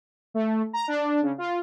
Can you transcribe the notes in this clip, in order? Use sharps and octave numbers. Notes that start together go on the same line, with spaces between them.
A3
A#5
D4
C#3
F4